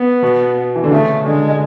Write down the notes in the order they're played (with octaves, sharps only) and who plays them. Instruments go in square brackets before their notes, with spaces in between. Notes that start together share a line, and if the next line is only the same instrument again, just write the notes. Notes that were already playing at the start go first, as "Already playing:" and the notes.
Already playing: [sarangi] B3
[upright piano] B2
E3
D3
[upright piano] C#3 [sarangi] A3
[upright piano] D3 [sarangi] G#3